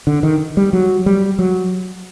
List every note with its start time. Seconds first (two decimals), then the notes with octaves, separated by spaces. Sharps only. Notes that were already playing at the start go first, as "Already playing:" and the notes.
0.07 D3
0.23 D#3
0.57 G3
0.73 F#3
1.06 G3
1.39 F#3